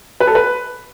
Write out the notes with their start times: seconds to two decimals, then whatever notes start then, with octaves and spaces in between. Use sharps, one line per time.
0.20 B4
0.27 A4
0.35 B4